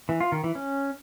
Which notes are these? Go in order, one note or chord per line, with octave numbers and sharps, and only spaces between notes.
E3
F4
D#3
E3
C#4